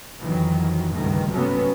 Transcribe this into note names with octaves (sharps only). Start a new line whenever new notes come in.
F2 D#3 E3 F#3
G1 C#2 G2 B2 D#3 A3
C3 F#3 A3 B3 C#4